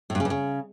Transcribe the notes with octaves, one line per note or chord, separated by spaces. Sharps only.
A2
G2
C#3
G2
C#3